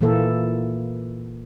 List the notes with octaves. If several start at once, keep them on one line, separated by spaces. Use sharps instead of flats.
A#2 E3 A#3 A4